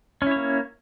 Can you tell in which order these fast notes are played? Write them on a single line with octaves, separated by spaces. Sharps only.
C#4 E4 C#5 A#3